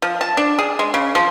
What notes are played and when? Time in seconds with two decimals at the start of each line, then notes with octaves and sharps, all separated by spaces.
0.02 F3
0.21 A5
0.37 D4
0.59 G#4
0.79 G#3
0.94 C#3
1.15 F3